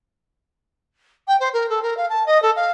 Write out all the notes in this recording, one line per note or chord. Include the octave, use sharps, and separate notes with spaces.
G5
C5
A#4
A4
A#4
F5
A5
D#5
A4
F5